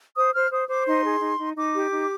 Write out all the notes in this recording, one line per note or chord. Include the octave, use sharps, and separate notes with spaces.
C5 D#6
C5 F6
C5 D#6
C5 D6
D#4 C6
G#4
D#4
D#4
D#4 D6
G4
D#4